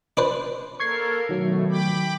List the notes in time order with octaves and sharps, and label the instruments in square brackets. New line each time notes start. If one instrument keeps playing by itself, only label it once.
[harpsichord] D4 B4 C5
[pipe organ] A#3 A4 A#4 [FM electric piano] C#6 G#6 C7
[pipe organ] B2 A3 [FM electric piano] D#3 F#3
[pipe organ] G5 B5 D6